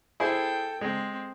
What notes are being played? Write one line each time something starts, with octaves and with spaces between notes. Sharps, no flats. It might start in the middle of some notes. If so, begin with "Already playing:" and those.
E4 G#4 A4 C5 G5
G#3 C4